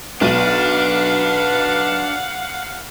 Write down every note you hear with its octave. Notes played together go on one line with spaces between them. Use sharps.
B1 D4 B4 F5 F#5 D#7